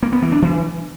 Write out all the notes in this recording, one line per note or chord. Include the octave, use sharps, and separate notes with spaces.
A#3
B3
E3
D4
E3